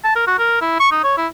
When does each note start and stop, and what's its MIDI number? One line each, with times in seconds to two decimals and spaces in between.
0.04 0.15 81
0.16 0.26 70
0.27 0.35 66
0.39 0.60 70
0.62 0.76 64
0.80 0.88 85
0.92 0.99 63
1.04 1.13 73
1.17 1.27 64